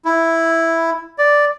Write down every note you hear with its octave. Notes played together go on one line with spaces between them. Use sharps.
E4
D5